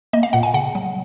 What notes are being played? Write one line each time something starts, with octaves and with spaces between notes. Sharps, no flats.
A#3 D#5
F5
A#2 F#5
G#5
C#3 F#5
F#3